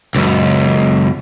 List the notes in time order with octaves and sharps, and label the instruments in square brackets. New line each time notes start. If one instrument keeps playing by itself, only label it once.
[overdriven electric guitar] C#2 F#2